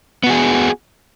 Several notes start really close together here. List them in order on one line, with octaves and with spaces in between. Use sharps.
B3 F#4 G#4